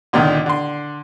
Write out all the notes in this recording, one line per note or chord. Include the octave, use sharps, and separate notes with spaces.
C#2 A#2 D3 D#3
D3 C6